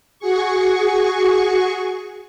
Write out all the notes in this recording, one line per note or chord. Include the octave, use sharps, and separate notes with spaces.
F#4 G#4 C#6